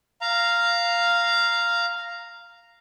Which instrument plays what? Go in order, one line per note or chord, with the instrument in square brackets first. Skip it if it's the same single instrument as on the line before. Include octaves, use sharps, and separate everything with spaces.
[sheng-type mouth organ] F5 A#5